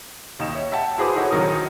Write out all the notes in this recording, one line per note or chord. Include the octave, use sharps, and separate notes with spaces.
D#2 D#4 E7
C#5 E5
E5 F#5 G5 A5
E4 F#4 G#4 B4 C5 D6
D#4 E4 F#4 A4 C5 C#5
A#1 D#3 F#3 D#4 A#4 D#6